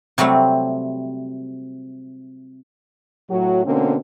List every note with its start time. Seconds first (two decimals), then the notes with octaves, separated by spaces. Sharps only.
0.18 C3 F#3 G3 A3 C4
3.30 A2 F#3 F#4
3.65 B2 D3 A#3 C4 C#4